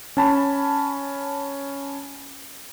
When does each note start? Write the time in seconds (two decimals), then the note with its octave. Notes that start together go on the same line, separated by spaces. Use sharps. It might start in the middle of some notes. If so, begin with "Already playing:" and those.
0.17 C#4 A5 B5